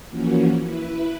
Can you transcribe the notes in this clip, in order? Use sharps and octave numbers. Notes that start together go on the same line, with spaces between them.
E3 F3 A#3 C#4 F#4
E4 B4